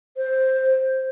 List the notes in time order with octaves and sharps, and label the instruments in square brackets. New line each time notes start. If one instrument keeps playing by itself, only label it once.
[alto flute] C5